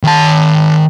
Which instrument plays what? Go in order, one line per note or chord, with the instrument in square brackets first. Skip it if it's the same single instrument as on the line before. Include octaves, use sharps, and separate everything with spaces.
[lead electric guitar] D#3 A5